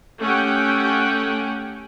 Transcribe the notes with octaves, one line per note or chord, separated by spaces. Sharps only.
A3 C#4 G4 F#5 G5